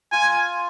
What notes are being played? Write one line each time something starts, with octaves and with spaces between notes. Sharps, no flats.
F4 G#5